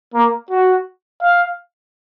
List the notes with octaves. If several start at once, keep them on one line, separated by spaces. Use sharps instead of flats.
A#3
F#4
F5